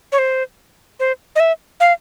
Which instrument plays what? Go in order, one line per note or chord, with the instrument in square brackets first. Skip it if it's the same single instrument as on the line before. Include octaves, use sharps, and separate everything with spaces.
[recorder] C#5
C5
C5
D#5
E5
F5